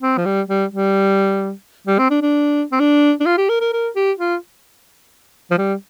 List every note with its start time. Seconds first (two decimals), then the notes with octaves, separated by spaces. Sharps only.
0.02 C4
0.17 F3
0.25 G3
0.49 G3
0.71 G3
1.87 G3
1.98 C4
2.10 D4
2.22 D4
2.72 C4
2.80 D4
3.20 D4
3.26 F4
3.37 G4
3.49 A#4
3.60 A#4
3.73 A#4
3.96 G4
4.19 F4
5.51 F3
5.58 G3